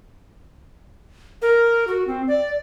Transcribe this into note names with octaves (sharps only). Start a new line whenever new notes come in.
A#4
F#4
C4
D5